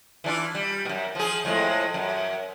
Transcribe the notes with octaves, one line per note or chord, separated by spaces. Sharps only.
E3 D4 F4
G3
F#2 B2
F3 G#4
F2 A2 G#3
F#2